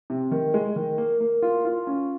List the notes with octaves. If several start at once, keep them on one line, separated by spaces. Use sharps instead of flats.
C3
D#3
G#3
D#3
A#3
A#3
F4
F4
C#4